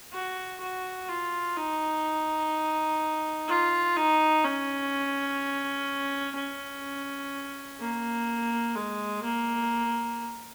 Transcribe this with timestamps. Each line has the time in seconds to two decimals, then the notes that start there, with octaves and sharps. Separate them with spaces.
0.13 F#4
0.61 F#4
1.09 F4
1.57 D#4
3.48 F4
3.97 D#4
4.44 C#4
6.35 C#4
7.80 A#3
8.75 G#3
9.23 A#3